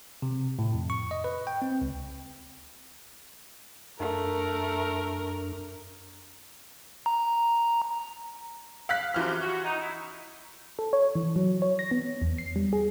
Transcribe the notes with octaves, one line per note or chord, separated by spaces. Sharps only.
C3
A2
F2
C#6
D#5
B4
G5
C4
C#2
F#2 A3 D4 A#4
A#5
F5 F#6 B6
F#2 C3 E3 F3 F6
F#4
D#4
E4
A4
C#5
E3
F#3
C#5
A#6
B3
E2
C7
G3
G#4